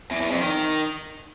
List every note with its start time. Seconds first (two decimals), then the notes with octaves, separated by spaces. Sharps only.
0.11 E2
0.21 E2
0.31 F2
0.41 D#3